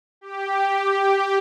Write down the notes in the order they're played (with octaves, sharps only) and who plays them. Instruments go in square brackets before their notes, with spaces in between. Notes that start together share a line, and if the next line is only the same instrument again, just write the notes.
[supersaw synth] G4